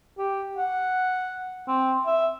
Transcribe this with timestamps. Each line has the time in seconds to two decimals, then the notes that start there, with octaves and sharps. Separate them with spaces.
0.18 G4
0.57 F#5
1.68 C4
2.06 E5